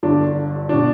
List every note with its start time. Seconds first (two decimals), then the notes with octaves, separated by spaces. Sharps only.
0.03 G1 G2 D3 D4
0.69 B2 D4